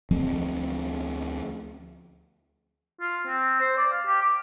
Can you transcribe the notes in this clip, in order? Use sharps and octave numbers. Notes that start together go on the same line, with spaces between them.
D2 F3 C4
F4
C4
C5
D5
F5
G4
D6